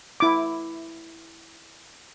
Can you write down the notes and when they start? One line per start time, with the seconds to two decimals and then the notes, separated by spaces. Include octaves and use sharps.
0.20 E4 D6